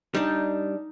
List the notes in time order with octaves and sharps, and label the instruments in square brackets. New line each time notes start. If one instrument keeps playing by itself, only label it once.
[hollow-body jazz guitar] G3 D4 [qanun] D#4